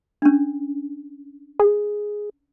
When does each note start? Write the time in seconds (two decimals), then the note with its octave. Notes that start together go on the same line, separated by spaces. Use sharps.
0.22 C#4 D4
1.59 G#4